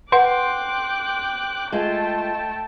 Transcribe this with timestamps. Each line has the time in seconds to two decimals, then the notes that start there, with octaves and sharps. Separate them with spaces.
0.12 B4 F#5 G5 C6 D6 F#6
1.72 G#3 A3 F4 G5 A5